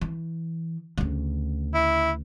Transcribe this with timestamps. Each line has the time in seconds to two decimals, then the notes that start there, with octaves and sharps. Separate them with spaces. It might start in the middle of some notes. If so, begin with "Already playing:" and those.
0.01 E3
0.98 D2 C#3
1.74 E4